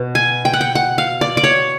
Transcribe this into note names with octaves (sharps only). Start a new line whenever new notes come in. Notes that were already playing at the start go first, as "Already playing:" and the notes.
Already playing: B2
G#5
G5
F#5
G5
F#5
F5
D5
D5
C#5